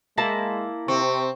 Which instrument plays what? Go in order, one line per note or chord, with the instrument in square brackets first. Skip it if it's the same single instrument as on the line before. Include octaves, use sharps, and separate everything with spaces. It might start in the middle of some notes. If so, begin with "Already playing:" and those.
[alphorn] G#3 [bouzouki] A#3 E4 A5
[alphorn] C3 [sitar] C4 [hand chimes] C#6